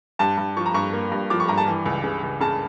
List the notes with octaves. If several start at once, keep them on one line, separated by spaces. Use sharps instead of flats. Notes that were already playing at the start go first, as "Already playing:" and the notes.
G2 A5
G2
F3 C#6
A#5
G2 C#6
A#3
G2
F3 D6
C#6
G2 A#5
A5
E3
C#2
C#3
C#2
C#3 A5